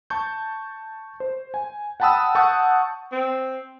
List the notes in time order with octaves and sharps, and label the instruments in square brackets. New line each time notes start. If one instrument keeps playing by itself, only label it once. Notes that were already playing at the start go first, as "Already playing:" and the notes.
[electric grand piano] A5 C#6 G6
C5
G#5
F#5 G5 A5 B5 D#6 E6
F#5 A5 C#6 D#6 G6
[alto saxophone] C4